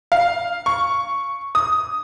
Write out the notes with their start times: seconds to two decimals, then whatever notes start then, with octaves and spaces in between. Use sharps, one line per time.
0.12 F5
0.66 C#6
1.55 D#6